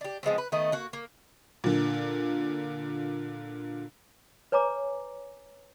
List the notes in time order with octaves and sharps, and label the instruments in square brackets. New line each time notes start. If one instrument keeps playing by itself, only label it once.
[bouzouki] D4 G4
F3 G#3 B3 C4
B4
D#3 A3 B3 D#5
A#3 F#4
A#3
[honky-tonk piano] A#2 D3
[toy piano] B4 C#5 G#5 A#5 D6